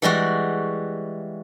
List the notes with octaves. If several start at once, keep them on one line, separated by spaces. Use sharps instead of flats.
E3 G3 G#3 F#4